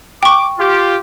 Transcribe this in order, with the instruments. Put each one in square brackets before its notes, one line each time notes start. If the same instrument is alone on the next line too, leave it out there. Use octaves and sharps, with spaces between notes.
[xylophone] G5 C#6 [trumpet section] D6
[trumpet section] F4 G4